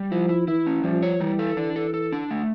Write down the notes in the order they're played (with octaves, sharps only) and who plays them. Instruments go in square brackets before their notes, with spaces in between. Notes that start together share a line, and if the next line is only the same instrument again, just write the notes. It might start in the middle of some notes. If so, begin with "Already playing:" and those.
Already playing: [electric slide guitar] G3
[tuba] F3 [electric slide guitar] E4
[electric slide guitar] E4
[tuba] E3 [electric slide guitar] E4
[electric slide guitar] C#4
[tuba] F3 [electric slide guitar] G3
[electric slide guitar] C#5
[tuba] E3 [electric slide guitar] G3
[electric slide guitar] A4
[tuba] E3 [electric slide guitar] D4
[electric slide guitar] A4
A4
D4
A3